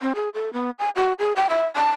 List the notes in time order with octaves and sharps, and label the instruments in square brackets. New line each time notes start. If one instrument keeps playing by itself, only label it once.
[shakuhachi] C4
G#4
A4
B3
G#5
F#4
G#4
G5
E5
A5